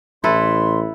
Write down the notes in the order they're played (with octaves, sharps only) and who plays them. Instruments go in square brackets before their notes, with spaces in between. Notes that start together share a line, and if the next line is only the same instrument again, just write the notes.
[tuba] A1 [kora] E4 A4 B4 [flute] C6